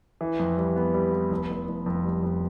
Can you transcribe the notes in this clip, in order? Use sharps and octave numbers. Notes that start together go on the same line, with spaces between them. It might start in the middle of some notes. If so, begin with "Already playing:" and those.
E3
F2
G3
B3
G3
B3
F1
F1
F1
F2
G3
F2